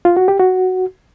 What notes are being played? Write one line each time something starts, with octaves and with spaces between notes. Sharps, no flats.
F4
F#4
G4
F#4